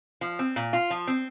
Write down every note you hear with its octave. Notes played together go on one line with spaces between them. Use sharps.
F3
C4
A#2
F4
F3
C4